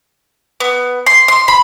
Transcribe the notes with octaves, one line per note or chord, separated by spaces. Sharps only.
B3
C6
C6
B5